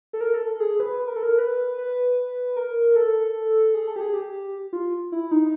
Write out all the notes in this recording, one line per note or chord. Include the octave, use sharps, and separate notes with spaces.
A4
A#4
A4
A4
G#4
B4
B4
A#4
A4
A#4
B4
B4
A#4
A4
G#4
A4
G4
G#4
G4
F4
E4
D#4